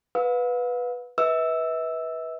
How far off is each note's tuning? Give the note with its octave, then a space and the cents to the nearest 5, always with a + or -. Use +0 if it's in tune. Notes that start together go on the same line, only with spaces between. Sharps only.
B4 +0 F5 +40 E6 -30
B4 -10 E5 -40 E6 +0